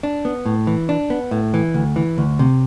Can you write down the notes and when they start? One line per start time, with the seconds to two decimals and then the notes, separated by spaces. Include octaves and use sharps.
0.03 D4
0.25 B3
0.46 A2
0.67 E3
0.89 D4
1.10 B3
1.31 A2
1.54 E3
1.74 D2
1.96 E3
2.18 D2
2.39 C3